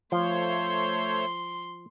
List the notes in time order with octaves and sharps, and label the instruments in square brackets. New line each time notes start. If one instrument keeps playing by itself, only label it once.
[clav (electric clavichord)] F3 [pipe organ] A3 C5 C#5 [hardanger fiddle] C6